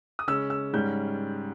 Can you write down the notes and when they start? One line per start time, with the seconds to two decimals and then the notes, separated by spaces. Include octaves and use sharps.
0.19 D#6
0.28 C#3 G#3 C#4 E6
0.50 E6
0.73 G#2 G3 C#4 G6